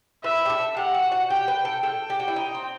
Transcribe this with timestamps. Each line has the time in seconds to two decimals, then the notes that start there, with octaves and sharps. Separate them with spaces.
0.23 B4 E5
0.45 G4
0.50 A4
0.76 G4 F#5
0.94 F#4
1.12 F#4
1.30 G4 G5
1.48 B4
1.65 A4
1.83 A4 G5
2.10 G4
2.20 F#4
2.28 E4
2.36 D#4
2.55 C4